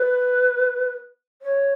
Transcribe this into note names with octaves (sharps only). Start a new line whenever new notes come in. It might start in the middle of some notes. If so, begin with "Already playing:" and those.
Already playing: B4
C#5